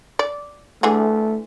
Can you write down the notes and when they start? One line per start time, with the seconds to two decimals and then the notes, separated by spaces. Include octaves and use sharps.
0.19 D5
0.83 D3 E3 A3 G#4